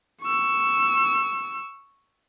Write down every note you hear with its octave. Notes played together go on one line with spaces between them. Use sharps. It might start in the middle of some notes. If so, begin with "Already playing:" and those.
C#6 E6